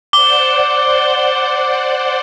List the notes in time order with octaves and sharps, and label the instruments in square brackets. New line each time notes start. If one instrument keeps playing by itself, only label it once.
[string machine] C5 D5 F#5 [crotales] D6 G7